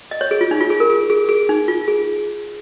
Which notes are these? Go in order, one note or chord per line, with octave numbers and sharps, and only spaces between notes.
D#5
C#5
G#4
F4
D#4
F4
G#4
A#4
G#4
G#4
G#4
D#4
F4
G#4